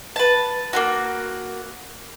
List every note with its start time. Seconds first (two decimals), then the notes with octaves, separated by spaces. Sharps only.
0.16 B4 A5
0.73 A#3 F4 F#4